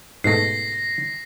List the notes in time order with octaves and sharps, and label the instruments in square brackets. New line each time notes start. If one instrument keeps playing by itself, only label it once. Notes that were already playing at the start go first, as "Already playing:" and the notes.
[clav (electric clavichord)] G#2 B2 A3 [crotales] A#6 C7